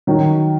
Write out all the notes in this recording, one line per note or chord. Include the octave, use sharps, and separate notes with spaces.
D#3 F#3